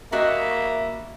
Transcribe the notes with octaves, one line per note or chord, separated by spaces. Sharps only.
G3 A#3 F#4 D#5 E5